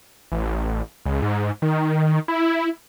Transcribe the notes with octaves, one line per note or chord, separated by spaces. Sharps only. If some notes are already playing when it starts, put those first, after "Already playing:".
A1
C#2
G#2
D#3
E4